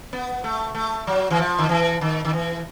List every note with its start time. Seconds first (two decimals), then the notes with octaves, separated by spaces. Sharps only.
0.13 B3
0.44 A3
0.75 A3
1.07 F#3
1.30 E3
1.38 F3
1.58 D#3
1.69 E3
2.01 D#3
2.25 D#3
2.33 E3